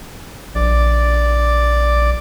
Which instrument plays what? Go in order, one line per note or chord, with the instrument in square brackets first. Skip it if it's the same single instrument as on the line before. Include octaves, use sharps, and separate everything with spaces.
[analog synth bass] A#1 [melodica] D5